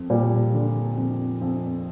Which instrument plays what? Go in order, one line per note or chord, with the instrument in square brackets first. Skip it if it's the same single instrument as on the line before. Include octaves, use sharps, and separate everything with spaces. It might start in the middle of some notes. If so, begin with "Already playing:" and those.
Already playing: [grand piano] F2
[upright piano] A#2 [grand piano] G3
[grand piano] D3
F2
F2